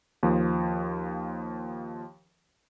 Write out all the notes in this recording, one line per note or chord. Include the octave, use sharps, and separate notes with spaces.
D#2 F3